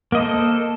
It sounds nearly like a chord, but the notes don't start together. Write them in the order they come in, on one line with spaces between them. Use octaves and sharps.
A#3 D#5 C5 A4